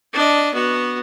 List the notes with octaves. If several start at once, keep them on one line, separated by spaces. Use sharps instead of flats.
D4 D#5
B3 F#4